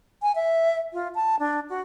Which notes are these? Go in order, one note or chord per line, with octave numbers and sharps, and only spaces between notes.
G#5
E5
F4
A5
D4
F#4